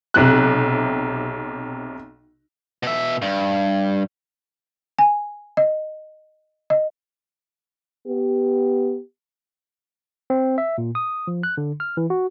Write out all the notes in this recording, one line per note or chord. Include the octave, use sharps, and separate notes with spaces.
B1 C3 F#6
B2 E5
G2
G#5
D#5
D#5
B3 G4
C4
E5
A#2
D#6
F3
F#6
D3
F6
E3
F#4